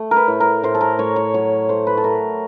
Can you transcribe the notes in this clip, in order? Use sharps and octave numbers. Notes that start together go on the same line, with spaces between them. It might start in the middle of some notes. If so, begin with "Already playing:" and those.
Already playing: A3
A#4
B4
A2
A#4
A2 C5
A4
A#4
A2 C#5
C#5
F#3 C#5
A3 C5
B4
A4
A3 A#4